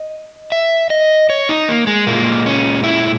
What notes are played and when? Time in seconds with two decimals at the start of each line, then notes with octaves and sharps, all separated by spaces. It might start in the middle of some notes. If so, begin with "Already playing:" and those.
Already playing: D#5
0.52 E5
0.90 D#5
1.30 C#5
1.49 D#4
1.69 A#3
1.87 G#3
2.07 A#2 G#3 A#3
2.46 C#4
2.84 E4